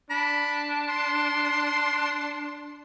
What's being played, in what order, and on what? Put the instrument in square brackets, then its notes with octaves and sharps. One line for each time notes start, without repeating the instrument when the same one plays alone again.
[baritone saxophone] D4 [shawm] B5
[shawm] C6